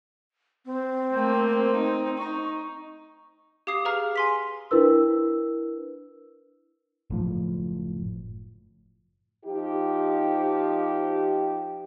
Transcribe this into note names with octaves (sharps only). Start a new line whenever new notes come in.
C4
A3 A#3
D#4
D#4 C#6
G4 F5 D6 D#6 C7
G#4 B4 F5 A#5 F6
G#5 C6 B6
D4 E4 A#4 B4 E6
F#1 A2 F3
F3 D#4 G4